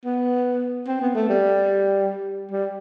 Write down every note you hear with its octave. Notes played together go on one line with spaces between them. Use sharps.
B3
C4
B3
A3
G3
G3